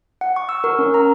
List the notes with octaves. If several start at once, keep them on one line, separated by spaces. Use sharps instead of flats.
F#5
C#6
E6
A#4
C#4
A#5